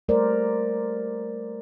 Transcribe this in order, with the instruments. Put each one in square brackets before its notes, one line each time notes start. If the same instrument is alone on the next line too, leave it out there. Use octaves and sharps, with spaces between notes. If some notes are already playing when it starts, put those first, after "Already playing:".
[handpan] G3 A3 A#4 C5 D5